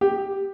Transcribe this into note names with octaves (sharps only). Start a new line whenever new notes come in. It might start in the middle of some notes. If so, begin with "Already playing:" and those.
G4